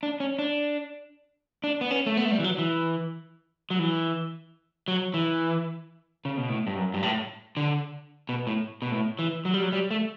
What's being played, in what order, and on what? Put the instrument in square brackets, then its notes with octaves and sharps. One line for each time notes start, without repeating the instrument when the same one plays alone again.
[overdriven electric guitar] D4
C#4
D4
D4
B3
C#4
A3
B3
A3
G3
E3
F#3
E3
F#3
E3
F#3
E3
C#3
B2
A2
G2
F#2
G2
A2
D3
B2
A2
B2
A2
E3
F#3
G3
F#3
G3
A3